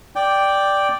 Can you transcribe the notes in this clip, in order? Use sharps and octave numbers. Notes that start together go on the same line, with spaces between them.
D5 G5